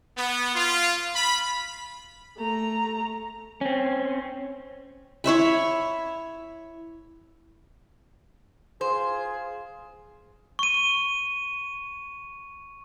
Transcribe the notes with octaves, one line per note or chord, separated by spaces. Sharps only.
B3
F4
B5
A3 A#5
C4 C#4
E4 C#5 E5 B5
F4 G#4 C5
C#6 D#7